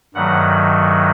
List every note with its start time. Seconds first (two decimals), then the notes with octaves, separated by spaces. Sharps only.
0.14 G2 D#3 F#3 A3 F#5